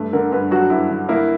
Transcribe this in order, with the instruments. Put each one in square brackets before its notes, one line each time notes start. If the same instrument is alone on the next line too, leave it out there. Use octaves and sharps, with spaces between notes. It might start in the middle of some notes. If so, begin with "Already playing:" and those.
Already playing: [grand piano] G2 A3
[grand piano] D3 [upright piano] A#4
[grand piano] G2 [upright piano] B4
[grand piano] F#3 [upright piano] F#4
[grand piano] G2 [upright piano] E4
[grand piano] D3
[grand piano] A#3 [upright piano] E4